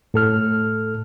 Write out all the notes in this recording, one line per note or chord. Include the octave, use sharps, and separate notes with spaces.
A2 A4 F6